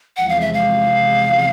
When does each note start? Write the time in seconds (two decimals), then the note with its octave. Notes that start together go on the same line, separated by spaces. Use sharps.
0.17 E2 C3 F3 G#3 F#5
0.29 F5
0.41 E5
0.53 F5